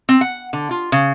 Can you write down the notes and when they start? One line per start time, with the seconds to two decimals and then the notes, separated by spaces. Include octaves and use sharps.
0.09 C4
0.21 F#5
0.53 D3
0.71 F4
0.92 C#3